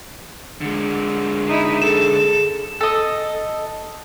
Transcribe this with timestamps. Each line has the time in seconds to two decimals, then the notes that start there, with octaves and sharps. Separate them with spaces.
0.61 D3 G#3
1.47 D#4 E4
1.82 G#4 A4 E7
2.81 A4 D#5